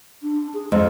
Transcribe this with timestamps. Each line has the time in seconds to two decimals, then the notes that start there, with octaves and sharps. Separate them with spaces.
0.23 D4
0.54 G#4
0.72 F2 G#3 D#5